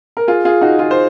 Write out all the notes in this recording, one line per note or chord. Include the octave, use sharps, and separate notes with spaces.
A#4
F4 G#4
F4 G#4
D#4 F#4
F4 G#4
C5